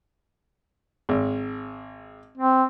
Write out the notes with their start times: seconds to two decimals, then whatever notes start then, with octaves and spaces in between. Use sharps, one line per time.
1.09 G#1
2.38 C4